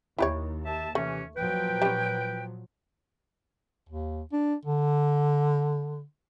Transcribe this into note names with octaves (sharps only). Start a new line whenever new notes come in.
D#2 E4 G4 C#5
G4 E5 A5
C3 E3 A3 C#4
A#2 F3 F#3 B4 G5
G3 C#4
D#2
D4
D3